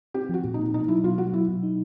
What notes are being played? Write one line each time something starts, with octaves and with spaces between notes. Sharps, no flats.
C4 G4
F3 F#4
A#2
D#4
A#2
B2 D#4
F#3 E4
B2 F4
F#3 F#4
B2 E4
B2
D#4